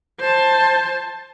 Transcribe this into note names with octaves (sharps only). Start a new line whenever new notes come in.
C5 A5